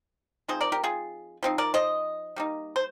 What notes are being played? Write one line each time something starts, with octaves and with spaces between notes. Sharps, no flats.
F3 C4 D#4 G#4 C5
A#4 D5
G4 A#4
F4 G#4
F3 C4 D#4
A#4 D5
C5 D#5
G3 A#3 D#4
C5